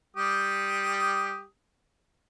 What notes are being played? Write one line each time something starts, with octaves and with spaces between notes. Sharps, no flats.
G3 G4 D#6